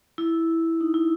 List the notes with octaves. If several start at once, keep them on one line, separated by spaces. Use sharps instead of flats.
E4
D#4
E4